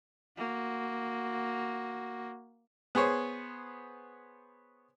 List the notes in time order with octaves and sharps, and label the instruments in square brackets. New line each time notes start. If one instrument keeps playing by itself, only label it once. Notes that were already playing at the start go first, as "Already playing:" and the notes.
[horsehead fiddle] A#3 F#4
[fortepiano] B3 G#4 C5 C#5